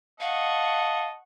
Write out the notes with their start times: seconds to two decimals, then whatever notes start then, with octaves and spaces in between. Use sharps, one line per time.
0.20 D#5 F5 F#5 A5 C#6